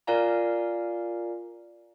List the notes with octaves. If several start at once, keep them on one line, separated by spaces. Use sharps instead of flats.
F4 A#4 D5 F5 G#5 A#5